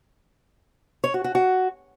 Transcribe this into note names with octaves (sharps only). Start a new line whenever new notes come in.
C#5
F#4
F#4
F#4